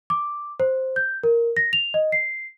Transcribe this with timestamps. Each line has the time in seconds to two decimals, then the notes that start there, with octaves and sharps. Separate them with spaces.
0.10 D6
0.60 C5
0.96 G6
1.23 A#4
1.57 A#6
1.73 F7
1.94 D#5
2.12 C7